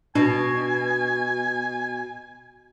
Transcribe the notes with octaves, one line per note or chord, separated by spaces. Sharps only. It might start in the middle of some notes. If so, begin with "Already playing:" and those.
B2 D4 G#5